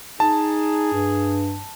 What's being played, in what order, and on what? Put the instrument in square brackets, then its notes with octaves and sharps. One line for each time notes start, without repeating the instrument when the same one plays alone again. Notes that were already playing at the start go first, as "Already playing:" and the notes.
[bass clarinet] D#4 [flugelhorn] G#4 [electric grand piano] A5
[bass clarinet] G2